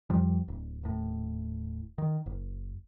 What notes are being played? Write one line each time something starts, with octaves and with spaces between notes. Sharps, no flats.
F2 F3 G3
D1
D#1 A2
D#3
F#1